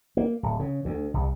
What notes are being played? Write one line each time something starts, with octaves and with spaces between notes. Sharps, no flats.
A#3
D1
C#3
D2
C2